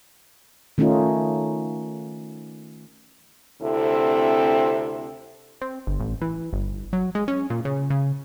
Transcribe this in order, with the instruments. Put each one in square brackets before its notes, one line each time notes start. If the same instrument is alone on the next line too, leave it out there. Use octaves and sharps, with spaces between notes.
[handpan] D#3 A3 C#4 D#4 F4
[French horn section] D2 C3 C4 E4 A4
[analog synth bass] C4
G1
A1
E3
G1
F#3
G#3
C#4
A#2
C#3
C#3